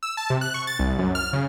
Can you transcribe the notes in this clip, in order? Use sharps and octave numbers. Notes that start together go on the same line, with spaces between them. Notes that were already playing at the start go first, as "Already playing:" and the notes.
E6
A5
C3
F#6
C#6
A6
C2
F#2
F6
C#3